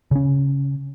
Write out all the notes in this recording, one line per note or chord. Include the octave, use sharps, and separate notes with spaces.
C#3 C#4